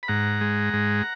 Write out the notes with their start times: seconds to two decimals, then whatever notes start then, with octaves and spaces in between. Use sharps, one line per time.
0.03 B5
0.08 G#2 F#5 A#5
0.41 G#3
0.73 G#2